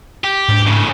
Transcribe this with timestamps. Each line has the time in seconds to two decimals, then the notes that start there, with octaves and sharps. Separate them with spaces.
0.24 G4
0.48 G#2 D4
0.67 A2 C#3